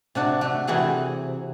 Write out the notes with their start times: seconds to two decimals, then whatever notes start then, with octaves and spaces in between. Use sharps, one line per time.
0.15 C3 D4 F#4
0.41 A3 F#4
0.67 C3 E3 C4 F#4 G#4